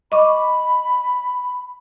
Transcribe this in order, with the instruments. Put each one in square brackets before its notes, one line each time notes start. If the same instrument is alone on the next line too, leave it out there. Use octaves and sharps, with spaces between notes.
[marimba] D#5 C#6 D6 [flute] B5